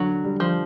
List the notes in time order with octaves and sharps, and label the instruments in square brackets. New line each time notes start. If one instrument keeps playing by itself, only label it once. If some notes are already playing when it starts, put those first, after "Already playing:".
Already playing: [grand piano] D3 [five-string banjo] F#3
[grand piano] G3
[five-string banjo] F3